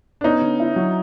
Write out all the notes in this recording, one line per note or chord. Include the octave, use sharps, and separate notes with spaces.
D4
B3 C#4 D#4
D3
E4
F#3